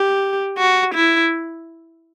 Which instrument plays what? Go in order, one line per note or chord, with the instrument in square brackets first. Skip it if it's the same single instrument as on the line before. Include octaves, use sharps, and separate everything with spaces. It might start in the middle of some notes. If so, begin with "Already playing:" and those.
Already playing: [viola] G4
F#4
E4